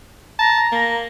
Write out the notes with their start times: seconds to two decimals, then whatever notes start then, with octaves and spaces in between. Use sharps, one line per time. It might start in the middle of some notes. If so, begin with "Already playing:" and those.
0.39 A5 A#5
0.72 A#3